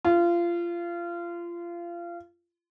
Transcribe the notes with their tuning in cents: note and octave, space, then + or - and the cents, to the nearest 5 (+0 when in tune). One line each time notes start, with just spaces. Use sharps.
F4 -25